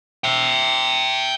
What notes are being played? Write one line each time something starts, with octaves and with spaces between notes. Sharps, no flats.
E5 G5